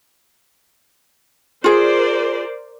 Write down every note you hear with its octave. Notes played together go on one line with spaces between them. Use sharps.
F4 G#4 A#4 C5 D5